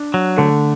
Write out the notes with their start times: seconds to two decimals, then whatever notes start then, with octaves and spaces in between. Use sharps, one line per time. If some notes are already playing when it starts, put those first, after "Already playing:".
Already playing: D4
0.14 F#3
0.38 D3 A3